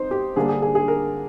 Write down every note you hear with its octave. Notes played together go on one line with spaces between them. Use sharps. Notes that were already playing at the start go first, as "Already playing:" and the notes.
Already playing: C4 D#4 C5
G4
D3 G3 A#3 D4 G#4
G#4
G#4
G#4
A#4